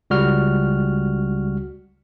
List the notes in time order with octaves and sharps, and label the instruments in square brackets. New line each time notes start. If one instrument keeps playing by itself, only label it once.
[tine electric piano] C#2 G3 F#4 F6